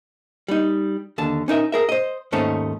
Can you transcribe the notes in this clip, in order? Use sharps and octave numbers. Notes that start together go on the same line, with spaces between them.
G3 D#4
D#2 D3 A5
C#4 D#4 A#4 E5
G#4 A#4 E5
C5 D#5
D#2 G#2 A3 C#4 D#4 C5